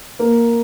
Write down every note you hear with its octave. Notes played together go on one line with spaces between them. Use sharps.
A#3